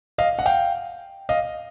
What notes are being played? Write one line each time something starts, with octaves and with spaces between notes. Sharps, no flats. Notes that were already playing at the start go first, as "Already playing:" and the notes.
D#5 F5
F#5
F5 G5
D#5 F5